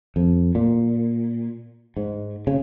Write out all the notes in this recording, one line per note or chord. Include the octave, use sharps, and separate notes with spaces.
F2
A#2
G#2
C#3